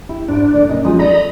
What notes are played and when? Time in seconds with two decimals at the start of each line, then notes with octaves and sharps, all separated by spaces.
0.09 E4 G4
0.28 G#2 D4
0.53 A#2 D#3 A3 D5
0.69 A#2 C#3 C#4 D#5
0.85 F3 G#3 D#4 F#4 G#4
0.99 A4 D5 D#5 A#5 B5